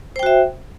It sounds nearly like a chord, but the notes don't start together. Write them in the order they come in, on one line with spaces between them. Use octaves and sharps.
C5 G5 F#4 E5